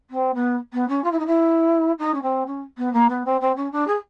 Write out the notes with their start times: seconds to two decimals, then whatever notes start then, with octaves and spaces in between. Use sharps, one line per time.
0.10 C4
0.34 B3
0.73 B3
0.88 C#4
1.04 F4
1.11 E4
1.19 D#4
1.26 E4
1.99 D#4
2.14 C#4
2.22 C4
2.46 C#4
2.77 B3
2.93 A#3
3.09 B3
3.25 C4
3.41 C4
3.56 C#4
3.72 D4
3.87 G#4